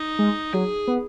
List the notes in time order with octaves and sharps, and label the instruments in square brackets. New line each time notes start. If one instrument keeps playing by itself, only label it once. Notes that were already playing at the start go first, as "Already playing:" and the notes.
Already playing: [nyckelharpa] D#4
[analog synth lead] G#3
[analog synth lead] F#3 [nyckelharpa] G#4
[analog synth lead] B3